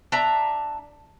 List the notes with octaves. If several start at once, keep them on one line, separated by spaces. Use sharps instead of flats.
D4 E5 A#5